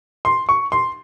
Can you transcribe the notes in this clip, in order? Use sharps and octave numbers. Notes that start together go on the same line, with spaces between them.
C6
C#6
C6